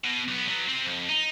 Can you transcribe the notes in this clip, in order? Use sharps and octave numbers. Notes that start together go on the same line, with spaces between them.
B2
B1 B3
F#3 B3
C3 C4
F2
D#4